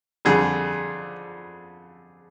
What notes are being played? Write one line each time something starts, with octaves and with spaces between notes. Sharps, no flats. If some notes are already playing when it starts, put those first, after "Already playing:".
F2 D3 G3 G#4